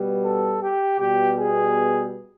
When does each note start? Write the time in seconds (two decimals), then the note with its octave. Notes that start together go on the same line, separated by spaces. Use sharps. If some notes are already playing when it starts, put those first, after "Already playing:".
Already playing: B2 G3 B3
0.24 A4
0.62 G4
0.99 B2 G3 B3 G4
1.37 G#4